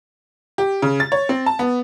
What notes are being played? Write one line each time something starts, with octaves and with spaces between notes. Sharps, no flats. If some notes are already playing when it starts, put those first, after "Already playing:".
G4
C#3
A6
C#5
C4
A5
B3